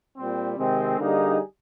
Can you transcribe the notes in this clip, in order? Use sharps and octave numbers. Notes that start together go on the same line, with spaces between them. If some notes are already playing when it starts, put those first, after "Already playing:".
A#2 G3 C4
C3 D#3 G#3 C4
D3 G3 A#3 D#4 G#4